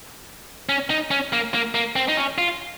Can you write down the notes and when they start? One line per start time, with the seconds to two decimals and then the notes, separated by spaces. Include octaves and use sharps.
0.69 C#4
0.90 D#4
1.11 C#4
1.33 A#3
1.54 A#3
1.75 A#3
1.96 C4
2.08 D#4
2.17 C#4
2.38 F4